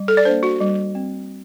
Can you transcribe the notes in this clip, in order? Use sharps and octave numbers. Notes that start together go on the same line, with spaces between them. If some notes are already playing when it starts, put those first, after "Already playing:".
Already playing: G3
A4
D5
A#3 D4 C5
F#4
G3
C4